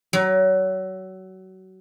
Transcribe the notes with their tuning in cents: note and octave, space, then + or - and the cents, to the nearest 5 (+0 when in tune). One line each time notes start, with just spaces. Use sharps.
F#3 +25